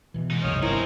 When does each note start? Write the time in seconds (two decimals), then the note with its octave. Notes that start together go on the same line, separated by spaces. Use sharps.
0.14 B2 E3
0.31 G#2 D#4
0.44 C2 F#2 C#5 D#6 F6
0.63 G1 C4 D#4 E4 G#4 A#4 C5